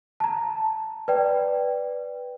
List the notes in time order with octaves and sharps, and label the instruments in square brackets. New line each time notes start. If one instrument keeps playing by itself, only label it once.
[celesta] A5 A#5
B4 D5 G5